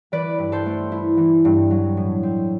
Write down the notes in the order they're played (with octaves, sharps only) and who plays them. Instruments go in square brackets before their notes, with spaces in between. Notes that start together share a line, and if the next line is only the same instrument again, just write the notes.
[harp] E3 B4 D5
G2
A4 C5
A3
E4
E3
G2
F#3
A2
C4